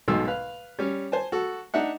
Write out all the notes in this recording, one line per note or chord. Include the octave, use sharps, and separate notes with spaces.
B1 G#2 B2 A4 E6
B4 F5
G3 C#4
C5 G#5 A5
F#4 A4
D4 D#4 E5 F#5